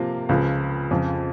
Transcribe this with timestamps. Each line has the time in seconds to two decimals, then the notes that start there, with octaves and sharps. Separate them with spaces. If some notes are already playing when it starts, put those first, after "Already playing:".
Already playing: C3 F3 A#3 F4
0.29 C#2 C#3 F3
0.91 F2 C#3 F3